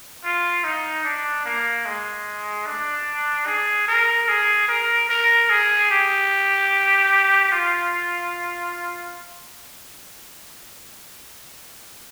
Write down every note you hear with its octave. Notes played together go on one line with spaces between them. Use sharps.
F4
D#4
D4
A#3
G#3
D4
G#4
A#4
G#4
A#4
A#4
G#4
G4
F4